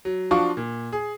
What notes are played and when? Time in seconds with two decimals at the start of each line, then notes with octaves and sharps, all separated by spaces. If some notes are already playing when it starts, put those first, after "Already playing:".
0.05 F#3
0.31 F3 D4 F4 F#4 C#6
0.57 A#2
0.93 G#4